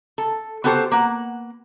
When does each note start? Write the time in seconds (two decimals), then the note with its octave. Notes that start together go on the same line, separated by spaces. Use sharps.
0.18 A4
0.64 B3 F#4 G4 A4 C5
0.92 A#3 F#5